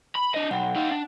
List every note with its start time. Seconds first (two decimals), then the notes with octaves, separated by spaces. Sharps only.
0.16 B5
0.35 D4 D#5
0.51 B1 F#5 G5
0.76 D#4 F5
0.91 D4